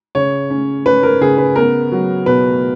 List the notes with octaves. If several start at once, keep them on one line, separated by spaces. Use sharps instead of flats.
C#3 C#5
C#4
C#4 B4
A#4
C#3 G#4
B4
B3 A#4
F#3
B2 B4